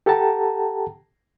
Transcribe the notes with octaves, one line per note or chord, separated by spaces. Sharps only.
G4 A4 F#5 G5 A5 A#5